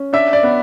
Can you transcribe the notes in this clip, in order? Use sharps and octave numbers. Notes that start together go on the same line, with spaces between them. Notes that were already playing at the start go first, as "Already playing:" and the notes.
Already playing: C#4
D4 E5
D5
B3